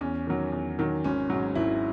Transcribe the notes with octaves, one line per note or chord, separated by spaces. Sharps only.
E2 C#4
D#3 F#3
E2
D#3 F#3
G#1 C#4
G#2 F#3
G#1 E4